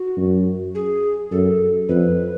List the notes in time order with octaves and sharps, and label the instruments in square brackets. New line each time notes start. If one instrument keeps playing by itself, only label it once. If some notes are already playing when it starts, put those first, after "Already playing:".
Already playing: [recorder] F#4
[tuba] F#2
[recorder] G#4
[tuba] F#2 [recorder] A4
[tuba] F2 [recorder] B4